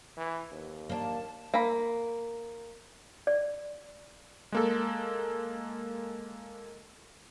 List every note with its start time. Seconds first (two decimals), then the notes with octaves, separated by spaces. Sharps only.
0.17 E3
0.51 D#2
0.89 A#3 D4 A5
1.54 A#3 B5
3.27 D5
4.52 G#3 A#3 A4